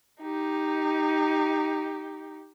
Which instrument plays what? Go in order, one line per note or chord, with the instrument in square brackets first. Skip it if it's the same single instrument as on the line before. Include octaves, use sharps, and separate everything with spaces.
[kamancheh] D#4 G4